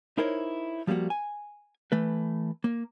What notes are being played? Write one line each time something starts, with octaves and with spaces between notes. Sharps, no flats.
D#4 E4 A#4 C5 C#5
F3 G3 A3 A#3 F#4
G#5
E3 A3 B4
A#3